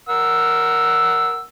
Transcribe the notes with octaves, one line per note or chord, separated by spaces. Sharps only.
A#4 F#5 E6